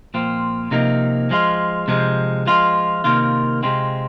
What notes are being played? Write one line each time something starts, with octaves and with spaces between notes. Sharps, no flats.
A#2 F3 C4 F4
C3 F3 A#3 D#4
F3 G#3 F4
C3 F3 G#3
F3 G#3 F4
C3 D#3 A#3 F4
C3 G#3 C4 F4